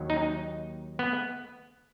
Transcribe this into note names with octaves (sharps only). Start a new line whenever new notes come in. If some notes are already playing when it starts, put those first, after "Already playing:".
Already playing: D#2 D#3 F#3
D#4
B3